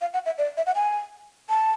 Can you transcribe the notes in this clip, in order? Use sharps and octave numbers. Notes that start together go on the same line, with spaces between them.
F5
F#5
E5
D5
E5
F#5
G#5
A5